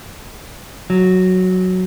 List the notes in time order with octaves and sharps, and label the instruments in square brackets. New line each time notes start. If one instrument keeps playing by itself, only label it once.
[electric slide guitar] F#3